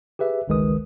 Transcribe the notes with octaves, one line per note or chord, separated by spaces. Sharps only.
G4 G#4 B4 E5
G1 C#2 D#3 G#3 B4 D#6